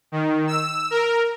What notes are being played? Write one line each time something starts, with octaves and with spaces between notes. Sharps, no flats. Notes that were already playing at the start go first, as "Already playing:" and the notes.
D#3
E6
A#4